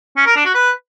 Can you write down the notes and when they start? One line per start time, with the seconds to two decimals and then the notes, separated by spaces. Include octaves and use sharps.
0.17 C#4
0.26 A#4
0.36 D4
0.45 F#4
0.55 B4